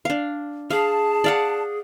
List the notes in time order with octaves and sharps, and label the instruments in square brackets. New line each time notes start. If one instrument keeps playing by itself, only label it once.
[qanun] D4 F5
[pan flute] G#4 [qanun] F5 [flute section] A5
[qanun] D5 F5 F#5